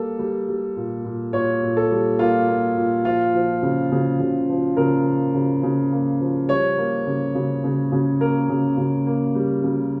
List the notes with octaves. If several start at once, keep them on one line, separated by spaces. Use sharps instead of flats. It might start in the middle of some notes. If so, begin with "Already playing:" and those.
Already playing: G3 A#3 A4
G3
G3
A#2
A#2
A#2 C#5
A#2
A4
G3
A#3 F4
A#3
A#2
F3 F4
F3
C#3
C#3
C#3
F3
C#3 A#4
A#3
C#3
C#3
A#3
F3
G3 C#5
A#3
C#3
C#3
C#3
C#3
A#3 A#4
C#3
C#3
A#3
G3
C#3